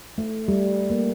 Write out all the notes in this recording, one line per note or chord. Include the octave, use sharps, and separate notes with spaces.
A3
G3
A#3